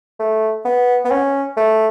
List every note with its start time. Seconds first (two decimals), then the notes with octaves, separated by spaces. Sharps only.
0.20 A3
0.65 B3
1.05 B3
1.11 C#4
1.57 A3